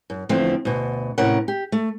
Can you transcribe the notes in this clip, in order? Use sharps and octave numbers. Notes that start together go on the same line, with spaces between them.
F#2
E2 D3 F3 A3 C4
D2 B2
A2 C3 C#4 A#4 F#5
G4
A3